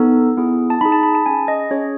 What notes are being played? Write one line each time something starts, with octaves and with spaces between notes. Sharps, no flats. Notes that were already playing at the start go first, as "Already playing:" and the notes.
Already playing: B3 D#4 A4
B3 E4 G#4
A5
D#4 G#4 B5
A5
B5
A5
C#4 G#4 G#5
D#5
C#4 G#4 C#5